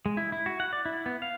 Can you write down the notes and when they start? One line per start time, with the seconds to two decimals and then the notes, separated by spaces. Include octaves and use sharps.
0.06 G#3
0.17 E4
0.32 E4
0.46 F#4
0.60 F#5
0.73 D5
0.86 E4
1.06 B3
1.22 F5